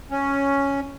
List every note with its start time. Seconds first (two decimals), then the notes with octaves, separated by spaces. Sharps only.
0.11 C#4